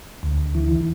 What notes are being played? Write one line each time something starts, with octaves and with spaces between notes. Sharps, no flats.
D2
E3